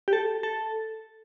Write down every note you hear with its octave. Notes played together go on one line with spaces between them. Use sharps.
G4
A4
A4